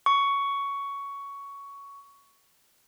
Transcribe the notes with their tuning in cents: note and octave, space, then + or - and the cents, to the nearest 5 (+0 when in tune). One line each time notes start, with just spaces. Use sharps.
C#6 +10